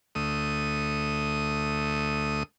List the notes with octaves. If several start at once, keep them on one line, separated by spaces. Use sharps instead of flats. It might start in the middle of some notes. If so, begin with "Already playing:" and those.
D2 A3 D#6